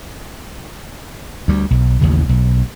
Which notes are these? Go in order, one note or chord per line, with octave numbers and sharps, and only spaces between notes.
D2 G3
B1
A1 D#2 C#3
B1